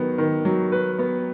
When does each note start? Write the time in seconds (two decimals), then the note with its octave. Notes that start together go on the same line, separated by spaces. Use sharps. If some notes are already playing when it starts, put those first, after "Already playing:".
Already playing: D#3 F#3 B3
0.18 D#3
0.45 F#3
0.72 B4
0.99 B3